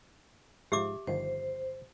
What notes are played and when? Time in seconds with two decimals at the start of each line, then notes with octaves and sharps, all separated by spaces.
0.72 G#2 F3 G4 E5 D6
1.07 G1 D#3 F3 C5